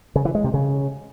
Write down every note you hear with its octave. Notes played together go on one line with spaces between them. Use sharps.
C#3
E3
G#3
C3
C#3